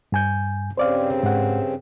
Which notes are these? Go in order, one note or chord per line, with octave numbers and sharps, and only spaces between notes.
G2 G#5 G6
G2 C#3 C4 C5 D5 F5
G#2 F#5